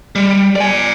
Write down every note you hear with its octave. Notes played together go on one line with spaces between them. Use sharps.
G3
D5 G#5